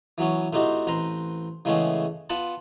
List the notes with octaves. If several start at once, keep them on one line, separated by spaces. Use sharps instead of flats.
E3 F#3 B3 C#4
A2 C4 D#4 F#4 G4
A1 C4 B4 A#5 C6
C#3 E3 G#3 A3 B3 C#4
B3 F4 F#5 A5 B5